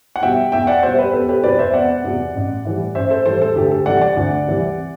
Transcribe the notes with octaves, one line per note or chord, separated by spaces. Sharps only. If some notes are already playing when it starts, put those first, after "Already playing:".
F#5
B2 G3 E5 G5
E2 E5 G5
D5 F#5
B2 G3 C5 E5
G4 B4
E1 A4
G4 B4
E2 C3 F#3 B4 D5
C5 E5
E1 D5 F#5
E2 C3 F#3
A1
A2 E3 G3
A1 C5 E5
A4 C5
A2 E3 G3 A4 C5
A4
D2 G4
A4
C3 E3 G3 D5 F#5
D5 F#5
D2
C3 E3 G3